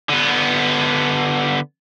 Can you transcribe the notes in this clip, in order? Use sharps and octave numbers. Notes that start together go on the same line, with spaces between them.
D3 B3